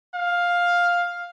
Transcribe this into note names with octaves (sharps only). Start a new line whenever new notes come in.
F5